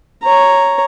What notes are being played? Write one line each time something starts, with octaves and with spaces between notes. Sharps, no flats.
C#5 A#5